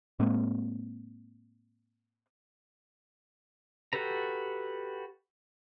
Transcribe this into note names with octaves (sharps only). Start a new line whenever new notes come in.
A2 G#3 A#3 C4
F#4 G4 A4 B4 A#5